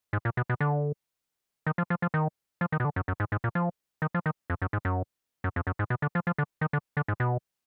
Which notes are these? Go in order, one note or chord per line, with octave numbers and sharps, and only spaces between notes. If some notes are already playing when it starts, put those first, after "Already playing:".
G#2
A#2
B2
B2
D3
D#3
F3
F3
F3
D#3
F3
D#3
B2
D3
F#2
F#2
G#2
G#2
A#2
F3
D#3
F3
D#3
F2
F#2
G#2
F#2
F#2
F2
F#2
G#2
B2
D3
F3
F3
D3
D#3
D3
D3
G#2
B2